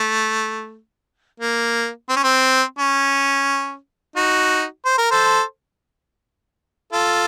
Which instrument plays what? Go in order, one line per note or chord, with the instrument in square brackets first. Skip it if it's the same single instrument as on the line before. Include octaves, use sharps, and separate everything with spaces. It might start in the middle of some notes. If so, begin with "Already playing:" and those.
Already playing: [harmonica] A3
A#3
C4
C#4
C4
C#4
D#4 F#4
C5
A#4
A4 C5
F4 A4